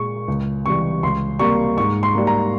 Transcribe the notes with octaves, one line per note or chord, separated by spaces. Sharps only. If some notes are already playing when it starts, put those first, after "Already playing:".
Already playing: A#2 G#3 C#6
C#2
C3 E3 G3 C#6
C#2 C6
C3 G3 A#3 C#6
G#2 C#6
C6
G3 A#3
A#5